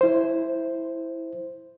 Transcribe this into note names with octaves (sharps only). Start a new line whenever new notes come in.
E4 C5